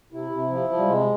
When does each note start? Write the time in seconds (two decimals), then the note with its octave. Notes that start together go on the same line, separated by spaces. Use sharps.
0.12 C3 E4
0.31 C3
0.50 F3
0.69 F3
0.77 G3
0.87 C3 G#3